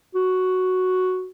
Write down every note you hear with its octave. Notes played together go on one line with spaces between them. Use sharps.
F#4